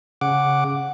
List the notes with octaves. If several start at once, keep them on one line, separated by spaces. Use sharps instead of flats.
C#3 F#5 D6